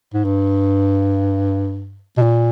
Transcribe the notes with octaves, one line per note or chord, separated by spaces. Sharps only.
G#2
G2
B2
A#2